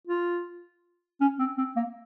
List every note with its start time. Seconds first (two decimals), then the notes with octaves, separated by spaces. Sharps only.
0.08 F4
1.21 C#4
1.39 C4
1.58 C4
1.76 A#3